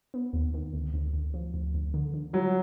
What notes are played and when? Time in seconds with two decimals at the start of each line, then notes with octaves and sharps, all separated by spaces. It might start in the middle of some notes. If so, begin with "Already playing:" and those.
0.14 B3
0.33 D#2
0.54 D#3
0.74 D2
0.94 D2
1.13 D2
1.34 F3
1.54 D2
1.74 D2
1.94 D3
2.14 D3
2.33 F#3 F4